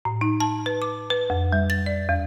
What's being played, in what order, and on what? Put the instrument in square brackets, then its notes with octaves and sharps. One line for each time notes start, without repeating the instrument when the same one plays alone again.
[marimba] A2
D#4
A5
B4
D6
B4
F2
G3
A6
D5
E2